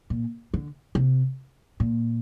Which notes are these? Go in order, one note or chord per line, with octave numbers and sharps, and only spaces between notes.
A#2
D3
C3
A#2